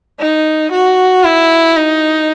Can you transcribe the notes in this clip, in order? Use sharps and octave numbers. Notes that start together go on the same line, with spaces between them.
D#4
F#4
E4
D#4